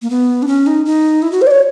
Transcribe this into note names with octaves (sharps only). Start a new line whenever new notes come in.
A#3
B3
D4
C#4
D#4
D#4
E4
F#4
C5
D5
C#5